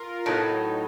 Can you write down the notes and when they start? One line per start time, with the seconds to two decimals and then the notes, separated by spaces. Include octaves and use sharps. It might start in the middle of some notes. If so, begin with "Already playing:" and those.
Already playing: F4 A#4
0.26 A2 F#3 B3 D#4